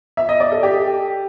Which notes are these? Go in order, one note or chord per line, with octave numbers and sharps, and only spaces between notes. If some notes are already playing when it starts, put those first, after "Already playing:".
E5
D#5
D5
A4
G4